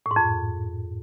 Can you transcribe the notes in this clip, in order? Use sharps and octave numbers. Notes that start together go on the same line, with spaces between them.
A2
G#2
F2